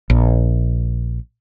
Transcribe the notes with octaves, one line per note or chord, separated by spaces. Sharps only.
A#1